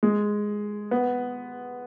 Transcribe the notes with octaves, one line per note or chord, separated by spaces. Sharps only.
G#3
B3